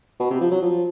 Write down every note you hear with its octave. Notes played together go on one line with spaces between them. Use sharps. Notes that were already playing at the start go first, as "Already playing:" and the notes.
B2
C3
F3
F#3
F3